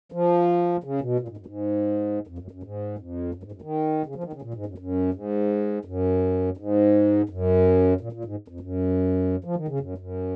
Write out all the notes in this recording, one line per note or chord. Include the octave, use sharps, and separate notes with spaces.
F3
C#3
B2
A#2
G#2
F#2
G#2
F2
F#2
F#2
G#2
F2
F#2
G#2
F#2
D#3
C#3
F3
D#3
C#3
A#2
G#2
F#2
F#2
G#2
F#2
G#2
F#2
A#2
A#2
G#2
F2
F#2
F3
D#3
C#3
F#2
F#2